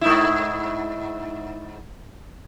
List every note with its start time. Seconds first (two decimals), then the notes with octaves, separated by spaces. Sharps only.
0.01 G#2 D#4 E4